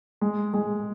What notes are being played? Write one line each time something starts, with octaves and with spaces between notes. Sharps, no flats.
G#3
G#3